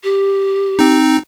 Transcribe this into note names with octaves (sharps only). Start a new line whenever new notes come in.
G4
C4 D#4